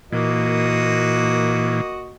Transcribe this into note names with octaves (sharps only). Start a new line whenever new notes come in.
A#2 E3 A#3 F#4 D#5